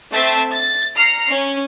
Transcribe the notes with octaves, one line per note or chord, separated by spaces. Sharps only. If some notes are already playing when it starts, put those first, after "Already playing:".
A3 C4 E5 A5 A6
A6
A#5 F6 C7 C#7
C#4